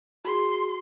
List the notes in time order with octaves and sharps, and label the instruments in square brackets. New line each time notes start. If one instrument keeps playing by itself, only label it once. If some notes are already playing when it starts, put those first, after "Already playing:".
[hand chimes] F#4 G#4 [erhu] C6